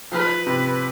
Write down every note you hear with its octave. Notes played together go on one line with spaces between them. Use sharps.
F3 B4
C3